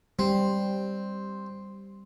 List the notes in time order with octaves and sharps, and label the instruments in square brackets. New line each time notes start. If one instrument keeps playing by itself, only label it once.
[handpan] G3 [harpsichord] C4